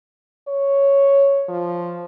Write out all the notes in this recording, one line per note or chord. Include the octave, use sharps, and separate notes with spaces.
C#5
F3